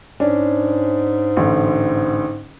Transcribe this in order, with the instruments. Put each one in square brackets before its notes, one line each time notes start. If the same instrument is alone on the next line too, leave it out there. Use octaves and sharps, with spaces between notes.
[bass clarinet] G#2 [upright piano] C#4 D4
[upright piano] A1 D3